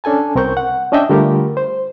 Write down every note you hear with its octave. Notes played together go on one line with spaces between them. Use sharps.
C#4 D4 A4 G#5 A5
C2 C4 A#4 C#6 G6
F#5
C#4 D4 D#5 E5 G5
D3 G3 A3 F4 G4 A#4
C5